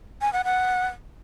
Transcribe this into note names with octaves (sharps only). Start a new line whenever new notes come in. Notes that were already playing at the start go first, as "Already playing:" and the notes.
G#5
F#5
F#5